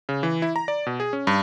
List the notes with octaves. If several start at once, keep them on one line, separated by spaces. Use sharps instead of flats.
C#3
E3
E4
A#5
D5
B2
G#4
C#4
G2